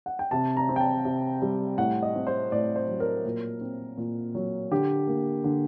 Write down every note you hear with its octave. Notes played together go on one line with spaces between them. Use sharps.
F#5
G5
C3 A5
A#5
C4
G5
A5
C3
G3
A2 F#5
D#5
C4
C5
A2 D5
C5
F#3
A#4
A#2
C4
A#2
F#3
D3 G4
A#3
D3